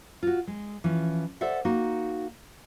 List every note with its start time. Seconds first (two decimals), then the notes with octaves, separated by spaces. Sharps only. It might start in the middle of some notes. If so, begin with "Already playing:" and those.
0.23 F4 F#4
0.47 G#3
0.84 E3 F3 C#4
1.41 A4 C5 D5 E5 F#5
1.65 A#3 D#4 F#4